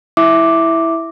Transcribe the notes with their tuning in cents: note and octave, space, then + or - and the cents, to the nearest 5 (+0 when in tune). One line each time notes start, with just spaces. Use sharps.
E4 -5 E5 +0 D6 +0